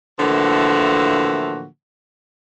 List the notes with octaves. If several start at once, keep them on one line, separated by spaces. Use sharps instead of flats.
A2 D3 E3 F3 A#3 F#4